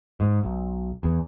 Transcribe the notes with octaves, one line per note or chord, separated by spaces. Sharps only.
G#2
B1
E2